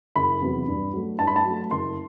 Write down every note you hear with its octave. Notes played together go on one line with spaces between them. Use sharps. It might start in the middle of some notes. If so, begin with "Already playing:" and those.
F#1 B5
E2 C3 F#3
G2
F#3 A3
G2 A5
B5
A5
F#3 A3
F#1 C6